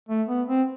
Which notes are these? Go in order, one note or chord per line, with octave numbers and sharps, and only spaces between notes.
A3
B3
C4